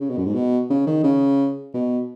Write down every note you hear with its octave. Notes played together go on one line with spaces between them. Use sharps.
C#3
B2
F#2
G#2
B2
C#3
D#3
C#3
B2